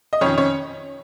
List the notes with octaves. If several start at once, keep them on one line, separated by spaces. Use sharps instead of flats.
D#5
F2 D#3 C#4 C#5
C#4 C#5